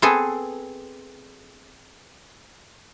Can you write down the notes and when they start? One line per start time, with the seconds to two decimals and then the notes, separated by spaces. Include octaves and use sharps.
0.02 B3 C4 G#4 A4